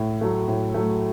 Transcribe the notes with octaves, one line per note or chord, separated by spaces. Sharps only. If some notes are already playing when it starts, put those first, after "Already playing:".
Already playing: A2
F#3 A3
A2
F#3 A3